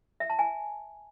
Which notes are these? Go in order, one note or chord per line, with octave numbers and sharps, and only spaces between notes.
E5
A5
G#5